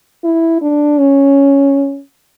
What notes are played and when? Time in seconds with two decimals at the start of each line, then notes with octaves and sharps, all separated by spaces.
0.24 E4
0.62 D4
0.99 C#4